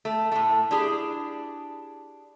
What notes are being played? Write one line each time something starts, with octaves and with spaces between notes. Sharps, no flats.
A3
A2 A3
D4 E4 G4 G#4